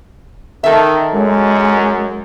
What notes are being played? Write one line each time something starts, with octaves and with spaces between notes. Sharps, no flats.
D#3 A4 E5
F#2 G#3